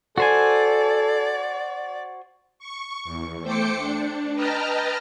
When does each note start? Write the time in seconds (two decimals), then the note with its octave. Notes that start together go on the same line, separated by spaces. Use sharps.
0.18 F#4 A4 C5 D5 G#5
2.59 C#6
3.04 E2
3.41 A3 C5 G5 D6 C#7
3.78 D4
4.34 B4 D#5 G5 A5 A#5 F6